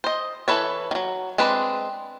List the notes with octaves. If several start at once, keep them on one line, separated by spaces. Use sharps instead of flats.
C5 D#5
E3 A4 B4 C#5
D#3 F#3
G#3 C4 D4 B4